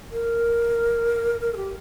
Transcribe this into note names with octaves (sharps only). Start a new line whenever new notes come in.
A#4
A#4
A4
G4